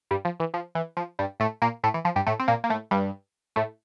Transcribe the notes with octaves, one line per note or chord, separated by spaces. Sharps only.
G2 G3
F3
E3
F3
E3
F3
G2 G3
A2 A3
A#2 A#3
A2 A3
E3
F3
G2 G3
A2 A3
C4
A#2 A#3
A#3
A2 A3
G2 G3
A2 A3